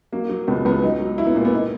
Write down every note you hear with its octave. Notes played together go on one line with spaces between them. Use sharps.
F#3 A#3
F#3
C#2 B3
C#2 B3
F#3 D#4
F#3
F#3 E4
B3
A#2 A#3
B3
D#4